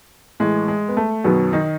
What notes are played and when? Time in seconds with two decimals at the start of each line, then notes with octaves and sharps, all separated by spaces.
0.40 A2 E3 G#3
0.68 G#3
0.88 B3
0.97 A3
1.25 F#2 B2 D#3 F#3 B3
1.53 D#3 D#4